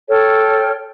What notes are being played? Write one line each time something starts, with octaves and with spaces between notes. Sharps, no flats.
A4 C#5 G5 F6